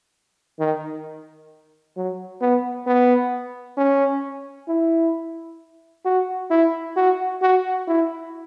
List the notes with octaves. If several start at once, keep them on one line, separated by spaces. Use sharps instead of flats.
D#3
F#3
B3
B3
C#4
E4
F#4
E4
F#4
F#4
E4